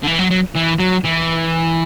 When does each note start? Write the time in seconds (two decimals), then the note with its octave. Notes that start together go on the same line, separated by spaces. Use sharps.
0.03 D3
0.07 E3
0.19 F#3
0.31 F#3
0.56 E3
0.80 F#3
1.05 E3